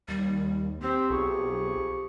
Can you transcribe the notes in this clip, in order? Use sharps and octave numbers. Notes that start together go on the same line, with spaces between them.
D#2 G3
C4 G4
B1 F2 G#4 C#6